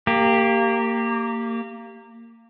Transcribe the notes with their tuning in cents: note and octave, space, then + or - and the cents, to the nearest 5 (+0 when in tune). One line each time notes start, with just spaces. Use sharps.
A#3 -20 G4 +0